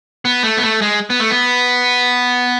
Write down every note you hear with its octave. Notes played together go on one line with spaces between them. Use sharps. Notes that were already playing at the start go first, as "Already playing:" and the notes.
B3
A3
B3
A3
G#3
B3
A3
B3